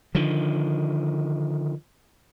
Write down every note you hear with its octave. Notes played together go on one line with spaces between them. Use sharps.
D3 D#3 F3